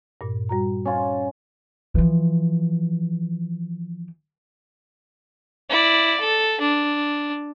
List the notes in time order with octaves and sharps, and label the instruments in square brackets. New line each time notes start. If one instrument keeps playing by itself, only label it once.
[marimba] G2 A#2
G3 F#4 A#5
[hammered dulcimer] C#4 F4
[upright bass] E3 F3
[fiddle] E4 D5
A4
D4